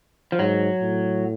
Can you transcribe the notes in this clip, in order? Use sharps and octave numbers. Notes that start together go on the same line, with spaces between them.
F3
G#2 F#3
A2